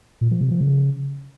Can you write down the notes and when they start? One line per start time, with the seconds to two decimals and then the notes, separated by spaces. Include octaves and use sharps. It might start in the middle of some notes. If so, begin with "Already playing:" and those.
0.21 A#2
0.31 F3
0.41 C3
0.51 F3
0.61 C#3